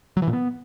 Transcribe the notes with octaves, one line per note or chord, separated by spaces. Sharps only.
F#3
E3
A#2
B3